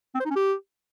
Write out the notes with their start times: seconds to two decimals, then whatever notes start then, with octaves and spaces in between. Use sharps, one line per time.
0.15 C4
0.20 C5
0.25 D#4
0.31 C#4
0.36 G4